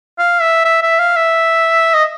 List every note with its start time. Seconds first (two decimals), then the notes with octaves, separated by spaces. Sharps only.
0.18 F5
0.41 E5
0.65 E5
0.82 E5
0.99 F5
1.16 E5
1.94 D#5